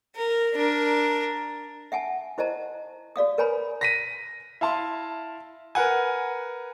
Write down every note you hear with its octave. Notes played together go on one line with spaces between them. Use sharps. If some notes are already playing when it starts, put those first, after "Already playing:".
A#4
D4 A#4
E5 F#5 G#5 A5
E4 C5 D#5 A5 A#5
F#4 D5 F5 D#6
A#4 B4 C#5 G#5 A#5 B5
A#6 B6 D#7
E4 F5 A5 C6
A#4 B4 F#5 G#5